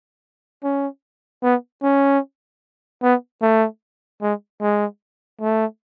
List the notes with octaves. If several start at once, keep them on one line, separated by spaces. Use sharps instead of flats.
C#4
B3
C#4
B3
A3
G#3
G#3
A3